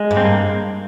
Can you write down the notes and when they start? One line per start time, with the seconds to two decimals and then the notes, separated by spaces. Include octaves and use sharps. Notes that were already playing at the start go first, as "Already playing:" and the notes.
Already playing: G#3
0.11 G2
0.17 C4
0.25 A#3